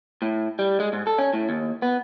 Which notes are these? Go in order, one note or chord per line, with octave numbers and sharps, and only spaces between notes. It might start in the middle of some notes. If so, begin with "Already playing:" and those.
A2
G3
G#3
G#2
A4
C#4
A2
D#2
B3